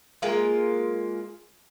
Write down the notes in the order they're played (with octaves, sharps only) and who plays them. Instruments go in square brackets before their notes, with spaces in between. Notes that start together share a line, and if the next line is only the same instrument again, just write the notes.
[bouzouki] G#3 A#3 F4